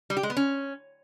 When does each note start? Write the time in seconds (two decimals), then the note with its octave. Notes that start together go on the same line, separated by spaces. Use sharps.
0.10 G3
0.17 G4
0.23 G#3
0.30 B3
0.37 C#4